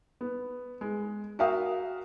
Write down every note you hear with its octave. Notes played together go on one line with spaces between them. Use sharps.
B3
G#3
F#4 A#4 E5 F5 G5 D#6